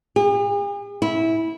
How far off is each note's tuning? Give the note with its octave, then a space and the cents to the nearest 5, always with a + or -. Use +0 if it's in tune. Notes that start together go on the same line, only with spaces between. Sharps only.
G#4 -45
E4 -15